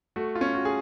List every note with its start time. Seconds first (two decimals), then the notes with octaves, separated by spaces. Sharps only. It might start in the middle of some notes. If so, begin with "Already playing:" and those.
0.16 A3 F#4
0.35 F4
0.41 C#4
0.55 F#4
0.65 G#4